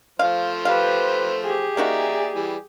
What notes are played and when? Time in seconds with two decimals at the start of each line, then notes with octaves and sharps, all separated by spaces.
0.19 F3 A3 C5 F5
0.65 G4 B4 F5
1.42 G4 G#4
1.77 A#3 D#4 F#4 D5 E5 A#5
2.35 E3 G3